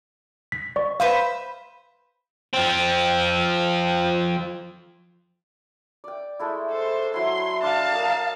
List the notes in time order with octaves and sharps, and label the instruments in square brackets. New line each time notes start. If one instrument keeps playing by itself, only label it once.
[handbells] B6
D5 C#6
[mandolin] B4 C5 E5 [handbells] F5
[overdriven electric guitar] F3 C4
[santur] D5 G5
G#3 A3 E4
[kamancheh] A4 C5
[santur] F#3 E4 [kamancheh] C6
[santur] D4 [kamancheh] F5 A5
[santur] A#4 D#5